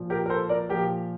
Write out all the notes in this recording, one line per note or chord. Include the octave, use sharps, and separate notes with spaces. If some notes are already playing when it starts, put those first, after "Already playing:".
Already playing: A#2 F3
G4 A#4
A#4
A4 C5
A#4 D5
A#2 F3 G4 A#4